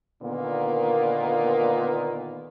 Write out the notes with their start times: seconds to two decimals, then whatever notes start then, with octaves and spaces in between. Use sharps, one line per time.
0.22 A#2 D3 D#3 A#3 B3